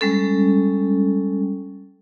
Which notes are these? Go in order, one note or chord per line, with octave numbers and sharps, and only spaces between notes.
G3 G#3 C#4 A4